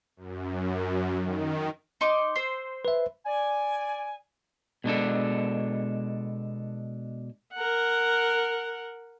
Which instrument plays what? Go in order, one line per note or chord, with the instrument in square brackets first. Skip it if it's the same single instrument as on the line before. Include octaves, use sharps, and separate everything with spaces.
[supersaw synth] F#2
D#3
[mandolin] D#4 C6 D6
C5 E6
[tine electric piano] B4 E5
[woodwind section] D5 G#5
[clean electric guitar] B2 G#3 D4 A4
[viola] A#4 F#5